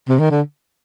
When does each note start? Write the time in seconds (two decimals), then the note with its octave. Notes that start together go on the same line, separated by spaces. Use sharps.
0.09 C3
0.19 D#3
0.31 D3